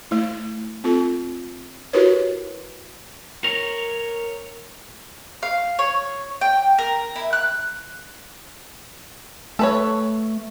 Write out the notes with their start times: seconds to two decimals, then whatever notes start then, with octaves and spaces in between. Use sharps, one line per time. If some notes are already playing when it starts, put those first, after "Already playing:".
0.11 A3 E4
0.84 C4 F4 A4
1.93 E4 F#4 G4 A#4 B4 C#5
3.44 A#4 C#5
5.43 F5
5.79 C#5
6.41 G5
6.79 A#4
7.15 E4
7.33 F#6
9.59 A3 A4 B4 C#5